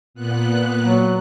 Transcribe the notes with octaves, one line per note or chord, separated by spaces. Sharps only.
A#2 B3 F#6
F#3